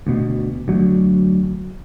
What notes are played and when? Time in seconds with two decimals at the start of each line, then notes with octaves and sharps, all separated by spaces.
0.07 D2 B2
0.68 D2 F#3